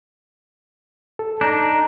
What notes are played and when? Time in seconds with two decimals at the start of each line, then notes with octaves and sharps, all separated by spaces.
1.19 A4
1.41 D4 D#4 A#5